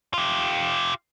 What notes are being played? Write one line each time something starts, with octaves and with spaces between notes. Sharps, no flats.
F4 G4